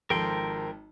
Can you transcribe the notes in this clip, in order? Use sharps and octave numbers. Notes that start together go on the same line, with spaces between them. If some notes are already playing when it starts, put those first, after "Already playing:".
G#1 F3 A4 A#4 G5 C6